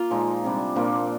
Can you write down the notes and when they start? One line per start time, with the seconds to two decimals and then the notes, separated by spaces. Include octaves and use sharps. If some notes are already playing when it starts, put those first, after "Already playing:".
Already playing: A#3 F4
0.10 A#2 F3 G#3 D#4
0.44 C3 G3 D4
0.76 A#2 F3 A#3 D4